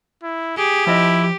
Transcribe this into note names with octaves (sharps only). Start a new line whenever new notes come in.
E4
G4 G#4
F3 E4 C5 D#5